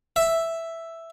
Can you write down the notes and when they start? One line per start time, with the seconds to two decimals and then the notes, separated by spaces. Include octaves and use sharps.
0.16 E5